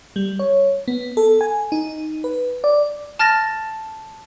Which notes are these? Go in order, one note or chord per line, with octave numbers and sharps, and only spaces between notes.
G3
C#5
B3
A4
G#5
D#4
B4
D5
A5 F6 A6 A#6